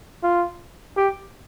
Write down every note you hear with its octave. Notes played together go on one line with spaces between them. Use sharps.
F4
G4